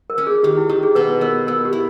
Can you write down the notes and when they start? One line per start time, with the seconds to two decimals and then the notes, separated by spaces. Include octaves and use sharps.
0.10 A#4
0.18 C#4
0.27 G#4
0.43 D#3 G4
0.57 E4
0.69 D#3 G4
0.83 G#4
0.95 B2 B4
1.21 B3 A#4
1.47 B3 A#4
1.65 G4
1.73 E4